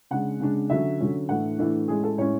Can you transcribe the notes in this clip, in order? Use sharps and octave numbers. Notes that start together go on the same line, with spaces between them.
C#3 G#3 D4 F#5
C#3 G#3 D4
D3 F#3 C#4 E5
D3 F#3 C#4
A2 E3 A3 D4 F#5
A2 E3 A3 D4
A2 G#3 C#4 G#4
A4
A2 G#3 C#4 C#5